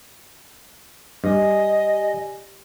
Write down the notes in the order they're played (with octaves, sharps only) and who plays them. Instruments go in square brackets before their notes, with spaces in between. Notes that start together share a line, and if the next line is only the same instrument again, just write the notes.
[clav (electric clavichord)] G2 [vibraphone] G4 D5 G#5 [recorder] D#5